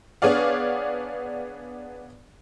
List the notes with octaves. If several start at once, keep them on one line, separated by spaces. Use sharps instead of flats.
B3 D4 G#4 C#5 D5 F5